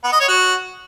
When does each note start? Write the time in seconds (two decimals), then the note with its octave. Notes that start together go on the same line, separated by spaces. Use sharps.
0.04 B3
0.12 D#5
0.20 C#5
0.28 F#4